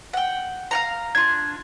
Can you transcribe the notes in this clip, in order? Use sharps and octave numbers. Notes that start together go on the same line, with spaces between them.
F#5 G5
F5 F#5 A#5
D4 F4 G#6